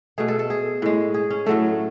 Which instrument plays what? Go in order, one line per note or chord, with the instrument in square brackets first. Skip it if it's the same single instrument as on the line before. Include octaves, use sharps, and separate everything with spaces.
[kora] B2 A3 G#4
A4
A4
G#4
A2 G#3
G#4
C#4
A2 F#3 A3 A4